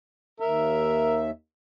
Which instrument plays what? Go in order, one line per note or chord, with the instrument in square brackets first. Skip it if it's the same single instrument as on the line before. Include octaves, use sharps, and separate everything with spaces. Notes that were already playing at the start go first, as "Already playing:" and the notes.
[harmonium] D#2 E5 [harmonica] A#4